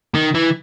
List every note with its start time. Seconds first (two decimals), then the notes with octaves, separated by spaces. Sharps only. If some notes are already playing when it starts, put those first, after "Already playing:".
0.15 D#3
0.35 E3